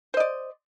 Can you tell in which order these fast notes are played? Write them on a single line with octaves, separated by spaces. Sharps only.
C5 D#5 D5